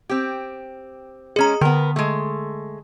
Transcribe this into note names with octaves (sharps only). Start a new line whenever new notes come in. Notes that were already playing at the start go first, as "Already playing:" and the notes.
C4 G4
G#3 C#4 G#4 A#5
D3 B3 A#4
G#3 A3